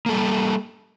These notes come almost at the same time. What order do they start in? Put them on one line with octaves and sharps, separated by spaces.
A#3 A4 G3